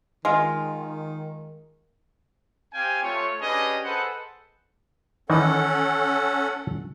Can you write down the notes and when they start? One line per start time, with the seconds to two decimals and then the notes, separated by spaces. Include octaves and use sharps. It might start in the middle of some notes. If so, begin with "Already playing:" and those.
0.25 D#3 G#3 F4
2.73 C4 G4 F5 G5 G#5
3.03 A3 F4 C#5
3.41 C#4 D4 G4 G#4 B4 D#5
3.84 G#4 A4 B4 C5 D#5 F#5
5.30 D#3 E3 C#4 D#4 A4 F#5